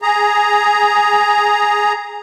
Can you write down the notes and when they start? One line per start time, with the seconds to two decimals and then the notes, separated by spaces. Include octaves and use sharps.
0.02 G#4 A#5